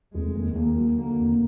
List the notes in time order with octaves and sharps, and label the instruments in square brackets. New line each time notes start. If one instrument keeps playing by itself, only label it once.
[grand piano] F1 [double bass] G#3
[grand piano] D#2
[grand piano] D#2 [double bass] A#3
[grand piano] F#3
[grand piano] D3 [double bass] A#3
[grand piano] F1